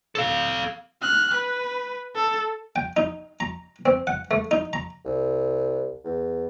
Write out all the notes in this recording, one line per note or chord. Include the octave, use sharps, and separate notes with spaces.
A4 F5
F6 F#6
B4
A4
G5
D#4
A#5
C4
F#5
A3
D#4
A#5
C2
E2